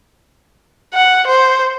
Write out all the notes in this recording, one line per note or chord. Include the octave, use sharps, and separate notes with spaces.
F#5
C5